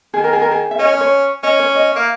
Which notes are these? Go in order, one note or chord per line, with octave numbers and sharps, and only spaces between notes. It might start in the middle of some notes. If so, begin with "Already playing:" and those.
D#3 G#4
A#4
G#4
A#4
G#4
E5
C#4 D#5
D#5
C#5
C#4 D#5
C#5
D#5
A#3 E5